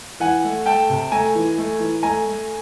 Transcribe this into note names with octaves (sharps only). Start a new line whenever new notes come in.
E3 F#5 G#5
A3
A3 G5 A5
C3
A3 G#5 A#5
E3
A3
E3
A3 G#5 A#5
A3